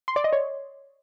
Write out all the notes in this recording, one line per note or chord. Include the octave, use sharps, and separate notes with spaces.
C6
D5
D#5
C#5